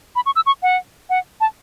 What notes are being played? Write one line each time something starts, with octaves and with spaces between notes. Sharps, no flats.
B5
C#6
E6
C#6
F#5
F#5
A5